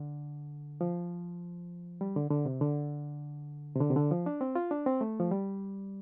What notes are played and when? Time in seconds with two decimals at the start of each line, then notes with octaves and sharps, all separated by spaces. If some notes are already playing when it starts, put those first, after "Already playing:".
Already playing: D3
0.81 F3
2.01 G3
2.16 D3
2.30 D3
2.46 C3
2.61 D3
3.76 C3
3.80 D3
3.90 C3
3.96 D3
4.11 F3
4.26 D4
4.41 C4
4.56 F4
4.71 D4
4.86 C4
5.01 A3
5.20 F3
5.31 G3